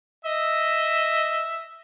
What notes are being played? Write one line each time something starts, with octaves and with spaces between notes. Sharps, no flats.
D#5 E5